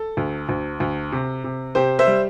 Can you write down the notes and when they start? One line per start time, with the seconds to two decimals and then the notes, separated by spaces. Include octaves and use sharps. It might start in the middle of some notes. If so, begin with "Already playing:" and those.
Already playing: A4
0.17 D2
0.49 D2
0.80 D2
1.12 C3
1.44 C3
1.75 C3 G4 C5
1.99 C5 E5
2.07 G3